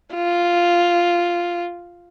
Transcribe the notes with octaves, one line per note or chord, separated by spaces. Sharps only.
F4